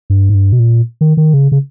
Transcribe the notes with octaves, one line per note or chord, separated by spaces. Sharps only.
G2
G#2
G2
B2
A#2
D#3
D#3
C#3
C#3